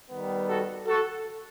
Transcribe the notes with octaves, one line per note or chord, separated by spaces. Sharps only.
D#3 G3 B3
F#4 A4
F#4 A4